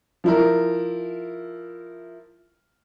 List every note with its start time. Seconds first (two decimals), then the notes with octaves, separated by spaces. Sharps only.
0.24 F3 E4 A#4